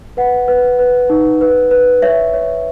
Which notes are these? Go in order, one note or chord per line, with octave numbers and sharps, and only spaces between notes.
B4 F#5
B4
B4
D#4
B4
B4
C#5 E5
C#5